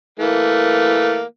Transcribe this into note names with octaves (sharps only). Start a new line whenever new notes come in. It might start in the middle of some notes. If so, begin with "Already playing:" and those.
E3 A3 A#3